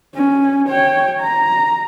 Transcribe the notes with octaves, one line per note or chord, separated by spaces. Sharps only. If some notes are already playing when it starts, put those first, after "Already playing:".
C#4
C#5 G5
A#5